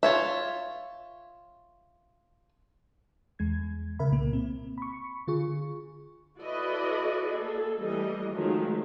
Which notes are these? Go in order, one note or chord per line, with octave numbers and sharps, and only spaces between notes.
F4 C#5 E5
E2 G#3 G#6
C#3 A#4 E5 B5
C2 A#2 A#3
C4
B5 C#6
D3 F4 G#4 C#6
E4 F#4 A4 B4 D5 D#5
A#3 G#4 A4
E3 G3 A3 A4 D#5
D#3 F3 F#3 G#3 A3 G#4